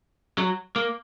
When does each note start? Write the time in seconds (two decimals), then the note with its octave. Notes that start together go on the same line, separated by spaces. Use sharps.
0.38 F#3
0.76 A#3